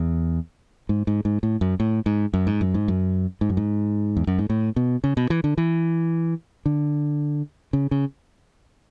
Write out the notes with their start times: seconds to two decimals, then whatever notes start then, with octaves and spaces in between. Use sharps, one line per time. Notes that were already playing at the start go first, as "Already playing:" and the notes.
Already playing: E2
0.89 G#2
1.07 G#2
1.25 G#2
1.43 A2
1.61 F#2
1.80 A2
2.06 G#2
2.33 F#2
2.47 G#2
2.61 F#2
2.74 G#2
2.88 F#2
3.41 G#2
3.49 F#2
3.57 G#2
4.17 E2
4.27 F#2
4.39 G#2
4.50 A2
4.76 B2
5.04 C#3
5.17 B2
5.30 E3
5.44 D3
5.58 E3
6.66 D3
7.73 C#3
7.91 C#3